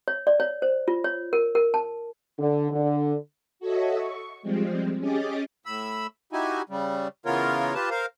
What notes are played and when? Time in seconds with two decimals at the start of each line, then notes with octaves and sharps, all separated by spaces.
0.08 C#5
0.27 D5
0.40 C#5
0.62 C5
0.88 F4
1.04 C#5
1.33 A#4
1.55 A#4
1.74 A5
2.39 D3
2.72 D3
3.60 F#4 A4 C#5 D#5 E5
3.96 C#6
4.42 F3 G3 G#3 C4
4.99 C#4 G4 G#4 D#5 D6 A6
5.66 A2 B5 E6
6.33 D#4 E4 F#4 G4 G#5
6.69 C#3 G3
7.26 C#3 E3 B3 F4 A#4 C#5
7.74 F4 G4 B4 A5
7.90 A#4 C5 F5